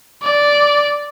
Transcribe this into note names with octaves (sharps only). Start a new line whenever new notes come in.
D5